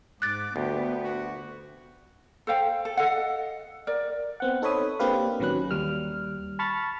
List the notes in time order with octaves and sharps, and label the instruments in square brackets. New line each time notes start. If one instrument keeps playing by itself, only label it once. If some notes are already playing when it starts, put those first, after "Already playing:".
[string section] G#2 [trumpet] D6 [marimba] F#6 A6
[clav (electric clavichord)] D2 [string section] B3 [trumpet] G4
[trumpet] F#4
[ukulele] A4 C5 F5 G5
A4
A4 D#5 F5 F#5
A#4 D5
[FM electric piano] B3 C4 F#5
D#4 A4 C5 C#5 B5 D#6
A#3 C4 D4 G4 B4 F5
A1 D#3 F#3 C#4 B4 F#6
D#2 G3 F6
A5 B5 C#6 F6 A6